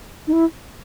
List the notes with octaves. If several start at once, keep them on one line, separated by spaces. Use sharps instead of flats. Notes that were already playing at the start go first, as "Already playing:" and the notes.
D#4
E4